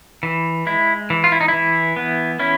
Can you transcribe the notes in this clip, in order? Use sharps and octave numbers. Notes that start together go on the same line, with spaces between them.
E3
G#3 E4
E3
F4
E4
D#4
E3 E4
B3
C#4 E4